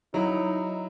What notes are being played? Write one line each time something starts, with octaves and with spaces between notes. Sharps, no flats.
F#3 D#4 E4